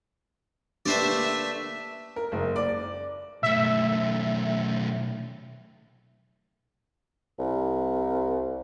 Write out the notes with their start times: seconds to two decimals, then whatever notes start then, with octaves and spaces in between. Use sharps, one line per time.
0.86 A3 A#3 D4 G4 B4 C5 D5 E5
2.16 A#4
2.32 F#1
2.56 D5
3.43 B1 A3 E5
7.39 C2